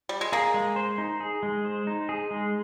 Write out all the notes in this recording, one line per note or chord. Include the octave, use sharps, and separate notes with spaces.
G3
G#3
A#3 G#4
G#3
C5
D#4
G#4
G#3
C5
D#4
G#4
G#3